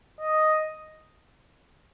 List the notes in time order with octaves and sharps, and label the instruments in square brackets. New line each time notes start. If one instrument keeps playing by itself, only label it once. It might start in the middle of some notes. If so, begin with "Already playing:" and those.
[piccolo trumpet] D#5